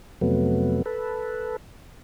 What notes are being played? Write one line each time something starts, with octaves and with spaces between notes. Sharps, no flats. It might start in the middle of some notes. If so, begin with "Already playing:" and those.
F2 C3 F#3 A3 B3
A4 B4